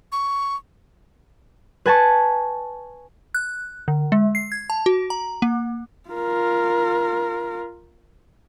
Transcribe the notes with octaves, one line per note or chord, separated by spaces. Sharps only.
C#6
B4 G#5 A5 C#6
F#6
D3
G#3
C7
G#6
A5
F#4
A#5
A#3
F4 A#4